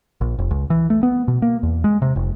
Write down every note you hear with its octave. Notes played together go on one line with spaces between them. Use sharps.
A#1
F1
C#2
E3
A3
B3
B2
A#3
E2
G#3
C3
F1